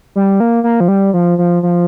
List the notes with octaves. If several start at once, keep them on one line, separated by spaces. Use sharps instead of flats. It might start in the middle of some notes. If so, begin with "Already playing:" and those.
G3
A#3
A#3
F3
G3
F3
F3
F3